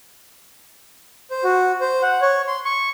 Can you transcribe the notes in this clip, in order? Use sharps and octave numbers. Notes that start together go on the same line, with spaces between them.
C5
F#4
C5
F#5
C#5
C6
C#6